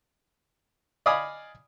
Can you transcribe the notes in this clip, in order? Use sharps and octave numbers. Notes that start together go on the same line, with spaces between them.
D5 D#5 F5 G#5 B5 D#6